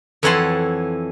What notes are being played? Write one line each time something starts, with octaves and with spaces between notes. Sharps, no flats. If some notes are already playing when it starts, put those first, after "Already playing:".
F2 E3 C#5 F#5 A5 C6